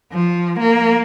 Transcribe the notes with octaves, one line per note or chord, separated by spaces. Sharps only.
F3
A#3